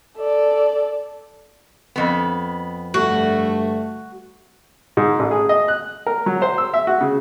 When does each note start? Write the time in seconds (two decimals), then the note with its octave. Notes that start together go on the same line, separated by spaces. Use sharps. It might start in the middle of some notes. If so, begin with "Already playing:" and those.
0.18 A4 D5
1.96 F2 B3
2.94 G2 D3 A3 F#4
4.97 G#2
5.19 A1
5.31 G#4
5.49 D#5
5.68 F#6
6.06 A#4
6.26 F#3
6.42 C5
6.58 E6
6.74 E5
6.87 F#4
7.01 C#3